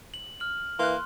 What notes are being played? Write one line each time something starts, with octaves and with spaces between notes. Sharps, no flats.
F#7
F6 F#7
E3 A#3 C6 F#6